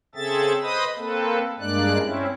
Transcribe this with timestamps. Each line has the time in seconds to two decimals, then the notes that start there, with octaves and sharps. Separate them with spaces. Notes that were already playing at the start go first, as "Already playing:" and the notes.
0.15 C#3 C4 G#4 A4 E5 A6
0.62 B4 C5 D#5 B5 D#6
0.97 A#3 C4 A4 B4
1.60 G2 G#3 A#3 D4 D5 F#6
1.99 C4 C#4 E4